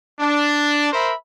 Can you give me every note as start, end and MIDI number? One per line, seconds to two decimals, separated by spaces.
0.20 0.87 62
0.93 1.13 70
0.93 1.13 72
0.93 1.13 76
0.93 1.13 83